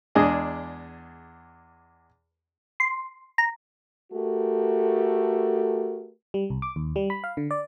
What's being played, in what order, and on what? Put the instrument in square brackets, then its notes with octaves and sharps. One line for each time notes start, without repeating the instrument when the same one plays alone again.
[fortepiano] E2 G#3 D4 G#4 D#5
[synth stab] C6
A#5
[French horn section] A3 F#4 G4 A4 A#4
[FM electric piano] G3
C2
D6
D#2
G3
B5
F5
D3
D5